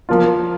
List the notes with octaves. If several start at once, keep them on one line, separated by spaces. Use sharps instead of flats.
F3 A#3 F4